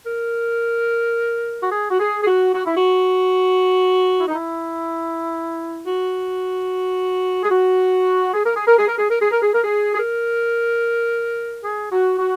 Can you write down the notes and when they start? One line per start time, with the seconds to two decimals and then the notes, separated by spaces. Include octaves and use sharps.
0.05 A#4
1.63 F#4
1.72 G#4
1.90 F#4
1.99 G#4
2.22 G#4
2.26 F#4
2.54 F#4
2.65 E4
2.76 F#4
4.20 E4
4.27 D#4
4.34 E4
5.84 F#4
7.43 G#4
7.50 F#4
8.34 G#4
8.44 A#4
8.55 G#4
8.66 A#4
8.77 G#4
8.87 A#4
8.98 G#4
9.10 A#4
9.20 G#4
9.31 A#4
9.42 G#4
9.53 A#4
9.64 G#4
9.94 G#4
9.98 A#4
11.64 G#4
11.92 F#4
12.19 F#4